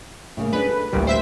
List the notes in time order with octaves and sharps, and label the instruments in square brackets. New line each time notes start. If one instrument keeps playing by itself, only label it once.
[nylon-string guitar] A2 C#3 A#3
[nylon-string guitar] G#3 C#4 D4 [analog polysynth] B4
[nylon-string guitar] A4
[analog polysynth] A1 D2 A#2 [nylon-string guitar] G3 D5
[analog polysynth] C5 E5 B6